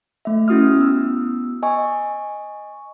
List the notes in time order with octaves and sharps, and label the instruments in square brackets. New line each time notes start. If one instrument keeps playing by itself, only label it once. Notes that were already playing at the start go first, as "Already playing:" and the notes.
[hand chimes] A3 E5
C#4 E4 F#4 D#6 F6
B3 E6
D#5 G#5 C#6